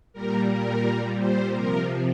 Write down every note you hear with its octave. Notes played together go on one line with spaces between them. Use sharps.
A#2 G3 A#4
A#4
C5
C3 F3 A#4